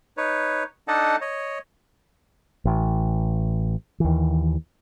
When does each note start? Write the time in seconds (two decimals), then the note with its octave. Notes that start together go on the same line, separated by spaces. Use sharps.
0.17 D#4 B4 C#5
0.88 D4 D#4 A4 D#5 F#5 A5
1.21 C#5 D#5
2.65 A1
4.00 D#2 E3